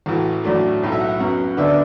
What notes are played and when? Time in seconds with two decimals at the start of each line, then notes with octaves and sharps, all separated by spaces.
0.06 A1 A2 E3 F#4
0.44 A1 A2 F#3 A3 D4
0.82 B1 A2 F#3
0.92 E5
1.00 F#5
1.19 F#2 F#3 B3 F#5
1.57 D2 D3 B3 D4 E5
1.67 D5